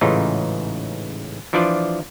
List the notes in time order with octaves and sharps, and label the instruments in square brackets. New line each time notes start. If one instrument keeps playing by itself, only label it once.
[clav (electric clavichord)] A1 G#2 C#3 E3 D#4 F4
E3 F3 D4 F4 C5 D5